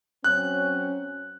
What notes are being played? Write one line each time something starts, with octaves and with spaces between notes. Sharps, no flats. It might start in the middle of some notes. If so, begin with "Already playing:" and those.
F#3 C4 C#4 F#6